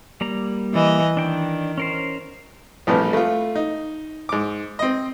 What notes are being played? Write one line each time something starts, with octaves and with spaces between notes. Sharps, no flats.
G3 A#3 A#5
E3 D#5
D#3 D4 G5
C#4 A#4 C5
A#1 A2 C3 E3 F3 G3
A3 F4
D#4
G#2 D6
C4 D#5